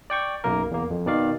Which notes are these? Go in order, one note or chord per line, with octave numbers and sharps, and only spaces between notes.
D5 G5 C#6
B1 F#2 A#3 A#4
E2 A#3
F2
B2 D#3 D5 F5